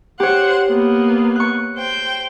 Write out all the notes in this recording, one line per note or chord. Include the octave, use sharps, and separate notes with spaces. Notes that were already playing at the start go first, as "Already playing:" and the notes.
G4 C5 C#5 F#5
A#3 B3
C#6 F#6
C5 G5